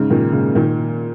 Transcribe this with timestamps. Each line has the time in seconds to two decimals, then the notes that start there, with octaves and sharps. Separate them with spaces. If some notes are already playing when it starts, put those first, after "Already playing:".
Already playing: G#2 C#3
0.10 A#2 D#3
0.33 G#2 C#3
0.55 A#2 D#3